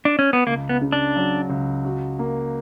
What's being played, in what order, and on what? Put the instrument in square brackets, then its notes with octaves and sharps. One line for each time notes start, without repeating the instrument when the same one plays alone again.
[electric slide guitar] D4
C#4
B3
[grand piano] C#2 [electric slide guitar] A#3
[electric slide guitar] B3
[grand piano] C#3
[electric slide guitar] D4
[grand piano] F#3
C#2
F#4
A#3